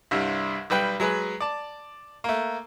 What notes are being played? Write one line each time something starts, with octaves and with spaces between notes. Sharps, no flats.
C2 G2 C3 G3
B1 G3 B4 G5
F#3 G#3 G#4 B4
D5 A5
A3 A#3